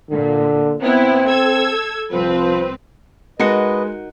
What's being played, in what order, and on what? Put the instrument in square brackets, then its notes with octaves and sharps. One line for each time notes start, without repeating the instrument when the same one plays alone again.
[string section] A#2 [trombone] D3
[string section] B3 E4 [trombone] C4
[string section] A4 E6 G#6
[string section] C2 C4 B4 [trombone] F3
[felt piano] G#3 C#7 [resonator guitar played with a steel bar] D#4 F#4 A#4 [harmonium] B4 D#5